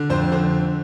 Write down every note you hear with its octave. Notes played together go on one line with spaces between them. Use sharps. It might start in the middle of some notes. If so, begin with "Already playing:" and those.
Already playing: D3
F2 C5
D3 C5